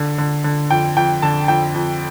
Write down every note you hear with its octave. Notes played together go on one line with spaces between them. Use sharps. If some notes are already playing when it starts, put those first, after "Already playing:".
Already playing: D3
D3
D3
F2 G5
F2 G5
D3 A5
F2 G5
F2